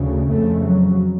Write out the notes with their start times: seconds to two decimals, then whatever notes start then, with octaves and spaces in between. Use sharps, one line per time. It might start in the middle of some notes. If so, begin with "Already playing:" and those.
Already playing: D2 C#3
0.28 F2 C#3 A3
0.65 F#3